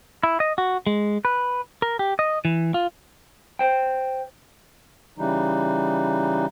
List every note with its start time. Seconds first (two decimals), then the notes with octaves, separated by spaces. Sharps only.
0.23 E4
0.40 D#5
0.58 F#4
0.87 G#3
1.25 B4
1.82 A#4
1.99 G4
2.19 D#5
2.45 E3
2.74 F4
3.59 C5 G5
5.18 C#3 E3 G3 D#4